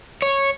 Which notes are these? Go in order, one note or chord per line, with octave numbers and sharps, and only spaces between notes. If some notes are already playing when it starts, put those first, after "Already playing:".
C#5